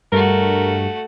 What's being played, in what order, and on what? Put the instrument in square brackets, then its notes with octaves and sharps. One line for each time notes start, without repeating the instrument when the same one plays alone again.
[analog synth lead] G2 [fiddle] A3 F#4 [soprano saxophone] A#4